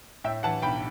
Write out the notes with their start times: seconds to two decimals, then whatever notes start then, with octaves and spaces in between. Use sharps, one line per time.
0.24 A2 E5 G5
0.43 E3 F#5 A5
0.62 B1 G5 B5